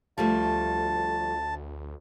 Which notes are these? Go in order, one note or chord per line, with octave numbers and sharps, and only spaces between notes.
D2 F3 G3 A3 A5